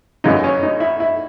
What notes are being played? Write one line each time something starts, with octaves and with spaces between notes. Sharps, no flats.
F#2 C#3 E3 D#4
C#4
D#4
E4
E4